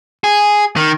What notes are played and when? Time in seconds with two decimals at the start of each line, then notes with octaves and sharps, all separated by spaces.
0.24 G#4
0.76 D#3